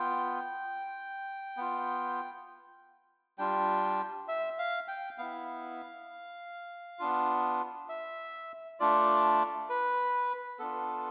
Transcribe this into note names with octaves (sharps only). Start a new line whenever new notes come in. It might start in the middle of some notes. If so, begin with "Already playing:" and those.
Already playing: B3 F4 G5
B3 F4
G3 D4 F4 G5
E5
F5
G5
B3 E4 F5
B3 D4 F4
E5
A3 D4 F4 D5
B4
B3 D4 F4 A4